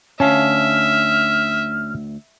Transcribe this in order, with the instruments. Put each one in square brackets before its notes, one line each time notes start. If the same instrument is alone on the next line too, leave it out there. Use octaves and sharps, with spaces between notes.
[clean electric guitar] D2 F5 A5 [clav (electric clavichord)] C#4 [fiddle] E5 [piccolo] F6